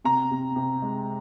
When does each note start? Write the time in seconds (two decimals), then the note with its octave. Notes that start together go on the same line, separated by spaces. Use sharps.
0.04 C3 A#5
0.31 C3
0.56 C3
0.82 G#3